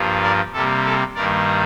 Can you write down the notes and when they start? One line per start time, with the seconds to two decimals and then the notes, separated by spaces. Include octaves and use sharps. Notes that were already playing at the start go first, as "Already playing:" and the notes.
Already playing: G2 F3 A#3
0.22 A#4 D5
0.53 C3 G3 A#3 A4
0.85 A4
1.15 G2 D#3 G3 A#3 A#4 D5